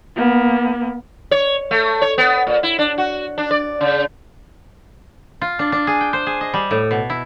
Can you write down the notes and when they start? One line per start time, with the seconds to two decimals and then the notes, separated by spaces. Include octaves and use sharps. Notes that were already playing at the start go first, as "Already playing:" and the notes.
0.16 A#3 B3
1.31 C#5
1.71 A3
2.02 C#5
2.18 B3
2.47 A#2
2.63 E4
2.79 D4
2.98 F#4
3.38 D4
3.51 D5
3.81 C#3
5.41 F4
5.59 D4
5.72 D4
5.87 G#4
6.01 G5
6.13 C5
6.26 G#4
6.41 D#5
6.54 G3
6.71 A2
6.91 B2
7.10 E4